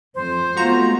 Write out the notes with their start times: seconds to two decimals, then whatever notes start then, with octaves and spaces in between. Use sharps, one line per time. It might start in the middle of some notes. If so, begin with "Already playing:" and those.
0.15 F2 C5
0.57 G#3 A3 B3 F4 F#4 A#5